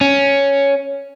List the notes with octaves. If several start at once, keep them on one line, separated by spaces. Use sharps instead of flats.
C#4